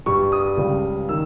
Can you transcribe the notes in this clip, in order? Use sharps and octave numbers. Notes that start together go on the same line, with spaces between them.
G2 G3 C#6
D#6
C#2 C#3 G3
D#3 E6